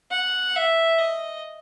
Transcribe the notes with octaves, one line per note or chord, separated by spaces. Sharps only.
F#5
E5
D#5